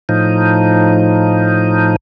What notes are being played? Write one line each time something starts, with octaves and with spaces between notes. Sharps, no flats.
A2 F3 D#4